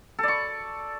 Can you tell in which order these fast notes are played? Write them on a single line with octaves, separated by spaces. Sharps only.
A4 D5 C#6